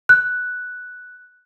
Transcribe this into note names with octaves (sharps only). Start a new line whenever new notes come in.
F#6